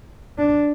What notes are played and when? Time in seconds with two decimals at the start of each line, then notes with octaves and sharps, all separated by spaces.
0.38 D4